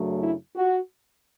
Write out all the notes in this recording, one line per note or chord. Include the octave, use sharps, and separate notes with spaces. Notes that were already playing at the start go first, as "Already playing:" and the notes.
Already playing: F#2 C#3 F#3 A3 D4
E4
F#4